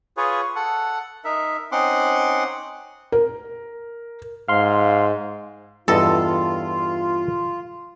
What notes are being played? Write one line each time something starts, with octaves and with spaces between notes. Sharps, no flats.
F4 G#4 B4 C#5
A4 F#5
D#4 A#4 E5
C4 C#4 D#4 F#5 C6 D6
A#4
G#2 F5 C6
E2 G2 F4 A4 D#5